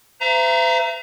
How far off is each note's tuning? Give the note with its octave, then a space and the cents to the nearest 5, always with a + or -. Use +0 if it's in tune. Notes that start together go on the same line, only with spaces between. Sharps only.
C5 -40 E5 +40 A#5 +0